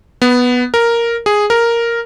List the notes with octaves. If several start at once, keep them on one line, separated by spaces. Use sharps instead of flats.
B3
A#4
G#4
A#4